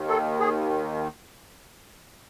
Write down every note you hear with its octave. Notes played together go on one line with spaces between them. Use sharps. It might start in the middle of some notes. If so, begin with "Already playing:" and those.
Already playing: D#2 D#3
A4
G#4